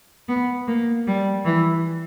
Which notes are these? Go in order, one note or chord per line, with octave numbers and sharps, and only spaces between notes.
B3
A#3
G3
E3